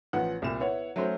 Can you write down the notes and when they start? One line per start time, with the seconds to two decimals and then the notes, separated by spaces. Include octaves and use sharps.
0.13 A1 F3 B3 F#5
0.42 C2 A#2 A#3 E7
0.60 B3 E4 C#5 F#5
0.96 F#3 A3 C#4 F#4 C5